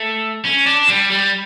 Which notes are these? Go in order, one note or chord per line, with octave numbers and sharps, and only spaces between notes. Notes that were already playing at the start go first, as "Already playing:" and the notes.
Already playing: A3
C#4
D4
G3
G3